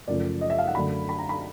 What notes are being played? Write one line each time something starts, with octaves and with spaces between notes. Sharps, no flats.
F#2 C#3 F3 A3 D5
D#5
E5
F5
F#5
F#2 D3 F#3 A3 B5
B5
A#5
B5